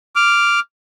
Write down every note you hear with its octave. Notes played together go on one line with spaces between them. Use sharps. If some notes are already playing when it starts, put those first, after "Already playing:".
D6 F6